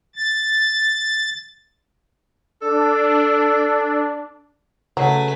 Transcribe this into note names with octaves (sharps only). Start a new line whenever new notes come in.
A6
D4 A4
C#3 F#3 A3 B4 G#5